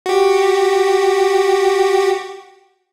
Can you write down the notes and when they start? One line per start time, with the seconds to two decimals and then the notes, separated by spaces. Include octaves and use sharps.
0.06 F#4 G4